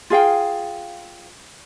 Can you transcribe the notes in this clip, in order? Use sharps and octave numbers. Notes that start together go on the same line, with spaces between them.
F4 G#4 F5 G5